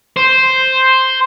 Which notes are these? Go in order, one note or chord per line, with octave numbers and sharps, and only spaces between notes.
C5